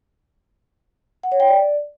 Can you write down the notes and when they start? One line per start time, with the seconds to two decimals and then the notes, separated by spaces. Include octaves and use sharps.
1.23 F#5
1.32 C#5
1.40 G5
1.48 D5